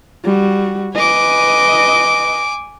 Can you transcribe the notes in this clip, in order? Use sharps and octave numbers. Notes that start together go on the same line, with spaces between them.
G3 F#4
B4 D#5 G#5 D6